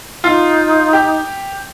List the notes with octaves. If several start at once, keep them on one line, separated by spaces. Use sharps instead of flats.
D#4 F4
G4